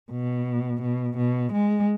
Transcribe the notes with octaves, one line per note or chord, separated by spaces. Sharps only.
B2
B2
B2
G#3